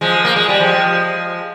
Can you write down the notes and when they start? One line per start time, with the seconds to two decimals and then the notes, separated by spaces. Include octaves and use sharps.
0.01 F3 G#3
0.25 A#3
0.36 G#3
0.49 G3
0.60 F3 G#3